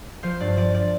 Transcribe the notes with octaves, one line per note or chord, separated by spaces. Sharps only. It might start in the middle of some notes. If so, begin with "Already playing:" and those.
F3 C5 F5
G2 D5
F3 D5
D5